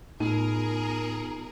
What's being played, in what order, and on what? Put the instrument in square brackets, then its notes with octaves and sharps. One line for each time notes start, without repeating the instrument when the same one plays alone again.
[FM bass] A2 [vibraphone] B3 F4 [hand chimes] D#4 [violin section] G#4 A#4